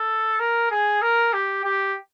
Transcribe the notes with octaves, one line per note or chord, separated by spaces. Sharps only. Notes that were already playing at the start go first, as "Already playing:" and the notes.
Already playing: A4
A#4
G#4
A#4
G4
G4